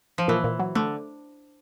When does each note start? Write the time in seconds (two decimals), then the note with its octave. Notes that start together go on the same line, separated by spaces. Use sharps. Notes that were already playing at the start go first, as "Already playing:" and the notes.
0.18 F3
0.28 A#2 E3
0.44 A#2
0.59 F#3
0.75 D3 A3